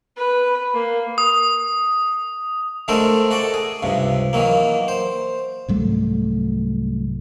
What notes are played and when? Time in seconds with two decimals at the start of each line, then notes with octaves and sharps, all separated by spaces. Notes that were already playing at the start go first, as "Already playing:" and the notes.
0.17 B4
0.73 A#3
1.18 D#6
2.88 D3 G#3 A3 A4 A#4 C5
3.31 F#4 A4 D5
3.54 G#4
3.82 C#2 G2 C3
4.33 D#3 E3 F#3 A#3
4.88 C5
5.69 C2 G#2 F#3 A3